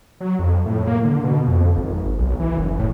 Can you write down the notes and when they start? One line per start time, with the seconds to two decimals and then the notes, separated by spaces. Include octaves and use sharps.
0.21 F#3
0.39 F2
0.66 A2
0.87 A#3
1.05 D3
1.24 B2
1.48 F2
1.77 G#1
2.19 B1
2.40 E3
2.58 F#1
2.79 A2